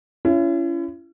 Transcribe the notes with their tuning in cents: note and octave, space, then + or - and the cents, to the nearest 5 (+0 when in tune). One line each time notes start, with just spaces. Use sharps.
C#4 +20 E4 +40